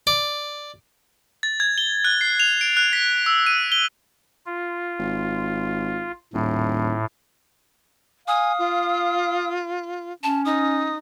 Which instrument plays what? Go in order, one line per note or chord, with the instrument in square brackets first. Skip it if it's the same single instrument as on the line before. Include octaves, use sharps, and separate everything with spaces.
[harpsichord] D5
[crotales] A6
G#6
G7
F#6
C7
F7
D7
F#6
B6
E6
D#7
G7
[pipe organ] F4
[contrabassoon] G#1
[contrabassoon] D#1 [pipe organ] A2
[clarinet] F5 [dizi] G#5 [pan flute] D#6
[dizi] F4
[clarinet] C#4 [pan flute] A5
[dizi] D#4 [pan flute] D#6